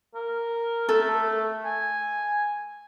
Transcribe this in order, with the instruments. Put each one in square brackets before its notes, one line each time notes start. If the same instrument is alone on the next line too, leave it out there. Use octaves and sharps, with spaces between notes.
[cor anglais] A#4
[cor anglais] A3 [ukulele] A4
[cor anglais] G#5